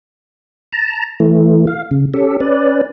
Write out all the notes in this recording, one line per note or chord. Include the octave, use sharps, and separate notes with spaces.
A5 A#5
E3 A3
F5
C#3
C#4 G4 A4
C#4 B4 D5